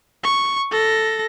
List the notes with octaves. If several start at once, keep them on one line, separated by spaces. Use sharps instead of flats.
C#6
A4 A#6